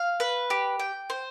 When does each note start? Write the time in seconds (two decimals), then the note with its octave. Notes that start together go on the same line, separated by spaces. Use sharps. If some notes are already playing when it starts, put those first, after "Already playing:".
Already playing: F5
0.20 B4
0.50 G4
0.80 G5
1.10 C5